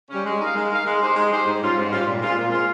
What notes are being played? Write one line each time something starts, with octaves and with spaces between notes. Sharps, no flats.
G3 C#4
G#3
D#4 A#4 F5
G#3
D#4 A#4 F5
G#3
D#4 G4 C5
G#3
D#4 G4 C5
G#2
G3 C#4 F4
G#2
G3 C#4 F4
A#2
G#3 C4 F4
A#2
G#3 C4 F4